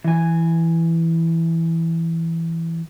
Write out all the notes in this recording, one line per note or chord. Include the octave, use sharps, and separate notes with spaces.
E3 G#5